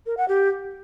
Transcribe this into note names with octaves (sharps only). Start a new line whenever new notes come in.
A#4
F#5
G4